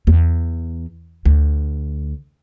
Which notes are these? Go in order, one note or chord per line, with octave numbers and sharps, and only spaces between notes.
E2
D2